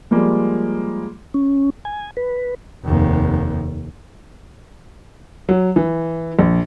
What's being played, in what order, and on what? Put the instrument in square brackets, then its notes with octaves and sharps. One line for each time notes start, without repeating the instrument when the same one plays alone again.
[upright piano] F3 G3 G#3 A#3
[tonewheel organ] C#4
G#5
B4
[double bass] F1 D#2
[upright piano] F#3
E3
A#1